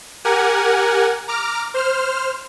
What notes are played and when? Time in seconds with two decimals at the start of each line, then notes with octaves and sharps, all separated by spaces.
0.25 G4 A#4 F#5 G#5
1.28 A#5 D6 F6
1.74 C5 F6